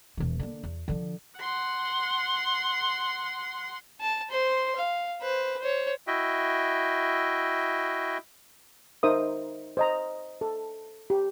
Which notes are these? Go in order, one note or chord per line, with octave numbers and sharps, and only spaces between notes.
E1 E3
D3 A#3
E2
D3 F3
F#5 C6
A5
C5 C6
F5
B4 C5
C5 C#5
E4 F#4 D#5 E5 G5
D#4 A#4 C5 E5 D#6
C5 D#5 A#5
A4
G4